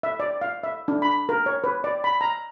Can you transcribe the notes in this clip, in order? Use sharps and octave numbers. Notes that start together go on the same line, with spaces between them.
E5
D5
F5
E5
D4
B5
A#4
C#5
B4
D5
B5
A#5